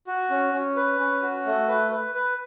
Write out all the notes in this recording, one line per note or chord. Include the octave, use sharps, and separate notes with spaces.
F#4
C#4
C#4
B4
C#4
F#4
A3
B4
B4
B4